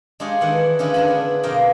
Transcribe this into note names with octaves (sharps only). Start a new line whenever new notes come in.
G#3 D4 F4 G4 G#4 C#5
D#3 E3 D4 E4 F#5
D3 C#4 E4 F4 G#4 B4
D3 D4 B5
B3 D4
F2 B2 A#3 A#4 F5 G5